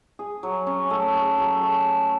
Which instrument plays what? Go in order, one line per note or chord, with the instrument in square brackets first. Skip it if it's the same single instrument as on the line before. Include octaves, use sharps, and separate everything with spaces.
[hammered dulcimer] G#4
F#3
C#4
A3
G#4
F#3
A4